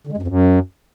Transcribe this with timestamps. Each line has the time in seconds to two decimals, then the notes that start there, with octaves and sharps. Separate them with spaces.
0.07 D3
0.12 G#3
0.17 F#2
0.22 F2
0.28 F#2